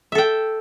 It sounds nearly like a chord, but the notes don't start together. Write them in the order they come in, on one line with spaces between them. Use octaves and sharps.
E5 A4 G5